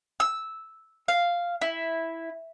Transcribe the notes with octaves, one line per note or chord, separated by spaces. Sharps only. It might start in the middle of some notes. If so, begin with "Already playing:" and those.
E6
F5
E4